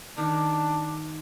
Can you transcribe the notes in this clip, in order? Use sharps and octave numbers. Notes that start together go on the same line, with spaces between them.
D#3 D4